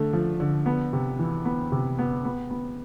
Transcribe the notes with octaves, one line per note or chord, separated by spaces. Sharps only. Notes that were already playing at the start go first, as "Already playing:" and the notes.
Already playing: D3 A3
F3
D3
B3
C3
E3
B3
C3
B3
B3
B3